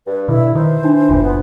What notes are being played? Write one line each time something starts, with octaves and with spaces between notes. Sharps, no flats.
G2 B4
B2 D3 E4
D#3 E3 C5
D4 D#4
F#1 D2 A#2 F4 G#5
B3